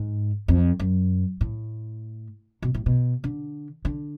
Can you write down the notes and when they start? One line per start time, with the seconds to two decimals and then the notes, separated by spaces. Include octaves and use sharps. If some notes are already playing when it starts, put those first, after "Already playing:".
Already playing: G#2
0.48 F2
0.79 F#2
1.41 A2
2.62 B2
2.74 A2
2.86 B2
3.24 D3
3.85 D3